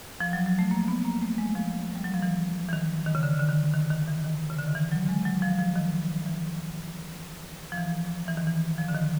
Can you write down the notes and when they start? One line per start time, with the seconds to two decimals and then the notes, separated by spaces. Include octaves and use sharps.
0.20 F3
0.33 F#3
0.46 F#3
0.59 A3
0.71 A#3
0.88 B3
1.05 A#3
1.22 A3
1.38 G#3
1.55 F3
1.96 G3
2.04 F#3
2.14 F3
2.22 E3
2.69 E3
2.73 D#3
3.06 D#3
3.15 C#3
3.23 D3
3.39 D3
3.49 D#3
3.74 D#3
3.90 D#3
4.08 E3
4.24 D#3
4.50 C#3
4.59 D3
4.67 D#3
4.75 E3
4.92 F#3
5.08 G#3
5.25 F#3
5.42 F3
5.59 F3
5.76 D#3
6.26 E3
7.72 F3
7.78 E3
8.28 E3
8.37 D#3
8.47 E3
8.78 F3
8.88 D3
8.95 D#3